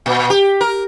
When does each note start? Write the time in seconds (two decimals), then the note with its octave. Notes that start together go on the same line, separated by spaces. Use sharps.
0.06 A#2
0.30 G4
0.61 A#4